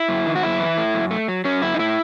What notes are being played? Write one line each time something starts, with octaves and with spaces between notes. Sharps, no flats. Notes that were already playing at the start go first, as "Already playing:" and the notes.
Already playing: E4
F#2
D#3
F#4
F#2 E4
E3
A3
F#2
A3
F#3
F#3 C#4
F#2 E4
D#4
A2 E4